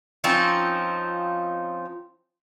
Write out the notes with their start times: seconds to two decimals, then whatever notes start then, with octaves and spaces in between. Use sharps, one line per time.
0.24 F3 C4 C#4 D#4